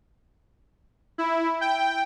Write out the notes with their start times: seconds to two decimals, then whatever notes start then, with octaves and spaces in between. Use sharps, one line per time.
1.18 E4
1.61 G5